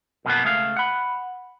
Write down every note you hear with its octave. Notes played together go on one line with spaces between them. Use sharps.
F#2 B2 F#3 G3 A#3 B3
C#2 A3 G#4 F5
F#5 B5